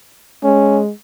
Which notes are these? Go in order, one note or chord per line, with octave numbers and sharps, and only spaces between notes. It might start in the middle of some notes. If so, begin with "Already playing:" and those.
G#3 C#4